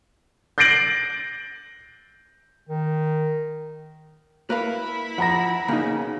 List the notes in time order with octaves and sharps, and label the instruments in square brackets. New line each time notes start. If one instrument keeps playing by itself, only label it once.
[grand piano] G6 A6 A#6 C7 D7 F#7
[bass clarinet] D#3
[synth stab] A#3 [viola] E4 B5 [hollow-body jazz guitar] B4 F5 A#5
[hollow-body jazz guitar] F3 [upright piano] F#5 A#5 A#6
[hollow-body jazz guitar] B1 C#3 [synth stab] A#3 D#4